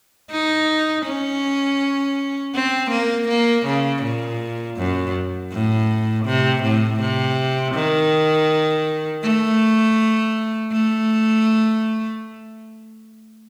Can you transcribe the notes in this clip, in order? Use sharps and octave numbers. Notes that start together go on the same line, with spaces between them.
D#4
C#4
C4
A#3
A#3
C#3
A#2
F#2
A2
C3
A2
C3
D#3
A3
A3